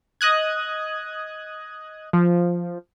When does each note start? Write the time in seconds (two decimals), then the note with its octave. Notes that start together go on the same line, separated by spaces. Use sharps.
0.21 D#5 D#6 F#6 G#6
2.13 F3